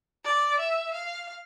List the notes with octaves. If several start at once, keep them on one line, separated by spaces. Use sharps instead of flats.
D5
E5
F5